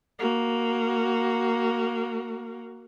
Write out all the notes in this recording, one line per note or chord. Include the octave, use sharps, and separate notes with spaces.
A#3 F#4